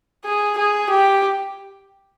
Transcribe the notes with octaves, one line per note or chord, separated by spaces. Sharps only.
G#4
G#4
G4